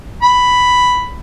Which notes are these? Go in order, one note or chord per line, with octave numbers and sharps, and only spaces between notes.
B5